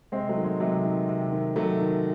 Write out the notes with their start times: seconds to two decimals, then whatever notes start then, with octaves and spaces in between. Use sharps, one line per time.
0.12 C3 G#3 C4
0.29 F#3 A3
0.37 D#3
0.45 G#3
0.60 C3 F#3 A3
0.85 D#3
1.09 C3
1.32 D#3
1.56 C3 F#3 A3
1.81 D#3